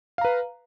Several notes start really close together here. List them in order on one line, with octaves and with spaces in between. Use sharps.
F5 A#5 B4